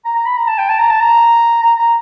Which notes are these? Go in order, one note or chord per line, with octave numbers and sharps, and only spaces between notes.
A#5
A#5
B5
A#5
A5
G5
A5
A#5
A5
A#5
A#5
A#5